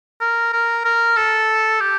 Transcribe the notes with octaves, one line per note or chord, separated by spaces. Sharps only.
A#4
A#4
A#4
A4
G4